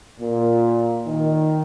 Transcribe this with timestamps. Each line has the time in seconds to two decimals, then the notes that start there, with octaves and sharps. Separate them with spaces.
0.20 A#2
1.07 D#3